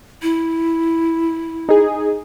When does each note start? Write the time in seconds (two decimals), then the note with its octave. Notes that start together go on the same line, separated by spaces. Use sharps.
0.22 E4
1.69 D#4 G#4